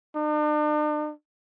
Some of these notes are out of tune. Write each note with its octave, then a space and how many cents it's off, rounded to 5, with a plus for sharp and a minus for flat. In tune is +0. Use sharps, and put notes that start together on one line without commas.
D4 +45